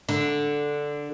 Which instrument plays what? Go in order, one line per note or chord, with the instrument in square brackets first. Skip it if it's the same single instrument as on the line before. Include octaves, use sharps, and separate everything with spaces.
[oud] D3